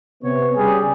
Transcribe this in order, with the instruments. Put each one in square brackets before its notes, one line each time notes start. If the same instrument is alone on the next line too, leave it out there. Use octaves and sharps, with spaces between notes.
[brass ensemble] C3 B3 C#5
[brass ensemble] C#3 G3 [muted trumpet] G#4